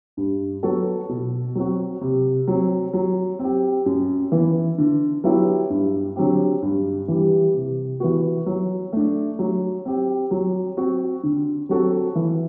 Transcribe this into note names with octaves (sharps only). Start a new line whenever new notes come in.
G2
F#3 B3 F#4 A4
B2
F#3 C4 F#4
C3
F#3 C4
F#3
C4 G4
F#2
E3 B3
D3
F#3 B3 E4 G4
G2
D3 F#3 C4 G4
G2
E3 G3
C3
E3 B3 F#4
F#3
A3 D4
F#3
C4 G4
F#3
C4 F#4
D3
F#3 C4 F#4 A4
E3